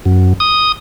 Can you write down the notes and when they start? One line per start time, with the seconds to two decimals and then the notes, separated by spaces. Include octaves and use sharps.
0.05 F#2
0.40 D#6